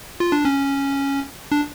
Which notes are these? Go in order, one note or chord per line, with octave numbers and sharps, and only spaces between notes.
F4
D4
C#4
D4